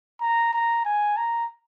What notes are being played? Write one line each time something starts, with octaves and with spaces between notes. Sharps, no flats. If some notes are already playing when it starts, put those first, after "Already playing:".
A#5
A#5
G#5
A#5